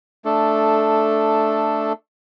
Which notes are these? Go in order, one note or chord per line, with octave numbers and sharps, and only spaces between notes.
A3 D4 A4